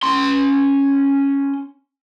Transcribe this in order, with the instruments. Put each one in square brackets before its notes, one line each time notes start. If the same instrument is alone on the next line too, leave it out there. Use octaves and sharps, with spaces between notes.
[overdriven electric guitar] C#4 C6